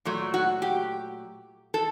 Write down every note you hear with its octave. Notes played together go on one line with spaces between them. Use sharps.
A#2 F#3 A3
F#4
G4
A4